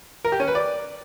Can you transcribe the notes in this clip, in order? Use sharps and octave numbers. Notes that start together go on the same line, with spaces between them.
A#4
G4
C#4
B4
D5